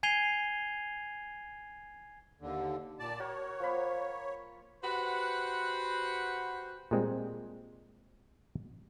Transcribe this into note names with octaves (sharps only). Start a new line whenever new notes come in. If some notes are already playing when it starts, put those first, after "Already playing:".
G#5 G#6 C7 D#7 F7 G7
D#2 D3
A#2 D5 A5
F#4 A#4 C#5
F3 A#3 B5
F#4 G4 B4 C5 F#5
A#2 G3 G#3 C4